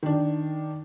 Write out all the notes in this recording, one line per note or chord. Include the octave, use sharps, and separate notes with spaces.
D#3 D4